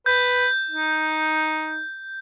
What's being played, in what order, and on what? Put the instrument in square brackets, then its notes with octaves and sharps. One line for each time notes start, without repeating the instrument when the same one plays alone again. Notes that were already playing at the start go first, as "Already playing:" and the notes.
[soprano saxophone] B4 [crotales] G6
[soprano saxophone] D#4